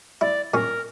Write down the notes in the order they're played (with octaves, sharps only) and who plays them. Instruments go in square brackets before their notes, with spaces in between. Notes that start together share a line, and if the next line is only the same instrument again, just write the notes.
[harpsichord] E4 [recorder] D5
[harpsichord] A#2 C#4 [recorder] A#4